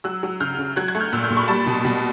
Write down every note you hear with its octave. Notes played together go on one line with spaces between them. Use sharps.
F#3 E6 F#6
F#3
C#3 F6 G6
C#3
F#3 F#6 G#6
F#6 G#6
A3
F6 G6
A#2 E6 F#6
F6 G6
A#2
B5 C#6
G3 A5 B5
B2
B2